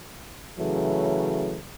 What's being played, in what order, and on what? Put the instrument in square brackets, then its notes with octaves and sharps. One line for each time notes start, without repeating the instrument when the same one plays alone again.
[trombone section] C#3 E3 F#3 A3